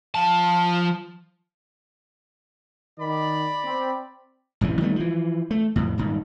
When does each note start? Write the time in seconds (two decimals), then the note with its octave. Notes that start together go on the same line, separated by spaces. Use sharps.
0.15 F3 A5
2.99 D#3 D5 B5
3.65 C4
4.61 A1 F#2 C3 E3
4.81 D#3 G3 A3 B3
4.96 E3 F3
5.51 A3
5.76 F2 A2
5.98 D#1 G#2